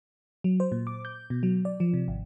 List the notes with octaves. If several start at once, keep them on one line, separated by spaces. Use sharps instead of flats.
F#3
C5
A#2
D6
G6
B2
F#3
D5
F3
C3
G#1